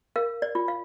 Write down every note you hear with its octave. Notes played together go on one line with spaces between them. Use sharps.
A#4 F5
D5
F4
F5